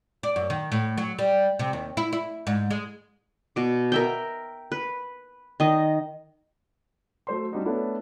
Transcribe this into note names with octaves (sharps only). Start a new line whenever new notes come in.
D5
F#2
D#3
A2
F#3
G3
C3
D#2
E4
E4
G#2
G#3
B2 D6
A#4 E5 G5
B4
D#3 D#5
F#3 A3 C5 C6
F#3 G3 C4 D4 D#4 F#4
A3 B3 C#4 D4 E4 A4